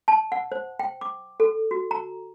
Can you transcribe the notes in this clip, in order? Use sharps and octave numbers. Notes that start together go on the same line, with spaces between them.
A5
F#5
C5
G5
D6
A4
F#4
A#5